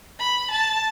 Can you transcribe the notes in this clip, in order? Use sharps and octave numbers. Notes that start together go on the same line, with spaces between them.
B5
A5